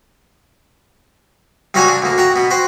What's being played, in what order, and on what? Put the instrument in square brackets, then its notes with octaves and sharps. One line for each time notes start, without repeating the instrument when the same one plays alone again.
[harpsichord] C2 G3 A#3 F#4 C#5 G#5
D4
D2 A#3
F#4 G5 A#5
B2 B3
F#4 C5 G5